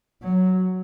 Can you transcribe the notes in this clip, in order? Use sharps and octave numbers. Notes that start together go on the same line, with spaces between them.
F#3